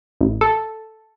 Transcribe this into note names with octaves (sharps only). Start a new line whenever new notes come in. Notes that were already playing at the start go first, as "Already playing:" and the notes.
A1
A4